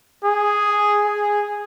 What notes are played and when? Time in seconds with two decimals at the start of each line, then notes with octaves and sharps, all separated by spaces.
0.25 G#4
1.05 G#4